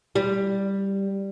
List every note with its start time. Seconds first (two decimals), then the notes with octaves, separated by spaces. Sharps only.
0.15 G3